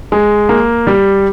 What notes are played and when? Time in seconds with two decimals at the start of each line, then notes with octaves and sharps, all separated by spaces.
0.12 G#3
0.49 A#3
0.87 G3